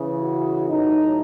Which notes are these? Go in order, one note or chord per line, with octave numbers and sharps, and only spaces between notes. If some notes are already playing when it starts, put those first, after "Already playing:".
Already playing: C#3 E3
F#4
A2 F#3 D#4